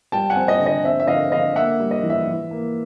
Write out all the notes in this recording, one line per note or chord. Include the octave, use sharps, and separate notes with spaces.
G3 G5 A5
F#5 G#5
C4
D#5
D3
D#5
C4 E5
E5
D3 D#5 F5
D3 D#5 F5
A#3 E5 F#5
G3
D#5
E3
E5
E3
A#3